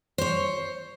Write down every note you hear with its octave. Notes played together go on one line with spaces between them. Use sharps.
C5 C#5